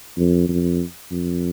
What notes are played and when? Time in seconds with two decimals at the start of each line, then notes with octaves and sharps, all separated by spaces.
0.17 F2
0.49 F2
1.11 F2